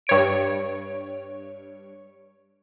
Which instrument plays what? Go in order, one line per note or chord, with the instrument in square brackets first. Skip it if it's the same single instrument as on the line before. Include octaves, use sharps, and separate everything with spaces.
[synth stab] G2 C#5 D7